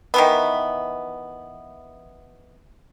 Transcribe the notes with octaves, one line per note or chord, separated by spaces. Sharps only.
D#3 E3 B3